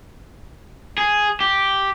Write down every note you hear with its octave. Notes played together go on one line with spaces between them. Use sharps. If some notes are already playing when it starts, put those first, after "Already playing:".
G#4
G4